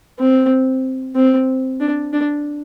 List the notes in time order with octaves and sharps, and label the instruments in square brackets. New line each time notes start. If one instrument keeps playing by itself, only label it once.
[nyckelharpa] C4
C4
D4
D4